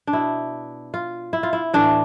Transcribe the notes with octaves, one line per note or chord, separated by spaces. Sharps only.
D4
B2 E4
F4
E4
F4
E4
A2 E3 D4